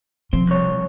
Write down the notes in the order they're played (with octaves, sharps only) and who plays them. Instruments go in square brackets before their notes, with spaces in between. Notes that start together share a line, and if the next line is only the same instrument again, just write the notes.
[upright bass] C3 F3 [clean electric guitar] C4
[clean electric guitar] C2 F2 C#5